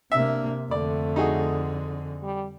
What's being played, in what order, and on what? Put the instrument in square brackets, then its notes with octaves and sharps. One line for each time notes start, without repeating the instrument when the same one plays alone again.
[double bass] C3 A#3 [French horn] D4 [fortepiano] E5
[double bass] F2 D3 [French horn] A3 [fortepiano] D5
[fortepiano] D#4 F#4 G#4
[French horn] G3